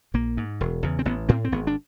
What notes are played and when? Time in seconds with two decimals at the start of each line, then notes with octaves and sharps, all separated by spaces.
0.14 A#1 A#3
0.37 G#2
0.61 E1
0.83 E2 C#3
0.99 C4
1.05 A1 B3
1.29 A2 C4
1.45 C4
1.52 G#1 B3
1.67 D4